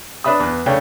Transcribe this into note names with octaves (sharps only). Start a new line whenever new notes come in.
D4 B4 E5 B5 D#6
E2 B4
C#3 A3 D4 C#5 G5